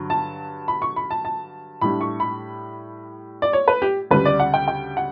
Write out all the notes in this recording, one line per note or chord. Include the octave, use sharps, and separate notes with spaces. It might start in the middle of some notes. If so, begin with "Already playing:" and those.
Already playing: G2 D3 F#3
A5
B5
C#6
B5
A5
A5
A2 G3 D4 B5
C#6
B5
D5
C#5
B4
G4
D2 C#3 G3 B4
D5
F#5
G5
G5
F#5